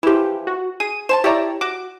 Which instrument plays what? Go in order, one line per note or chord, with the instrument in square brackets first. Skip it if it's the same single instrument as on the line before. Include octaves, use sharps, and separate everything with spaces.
[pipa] E3 F3 [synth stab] E4 G4
[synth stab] F#4
[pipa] G#4 [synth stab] D#7
[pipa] C5 G#5 A5 [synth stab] E7
[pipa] E4 E5 A#5 [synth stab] G4 C#5 D5
[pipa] F#4 [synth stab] D6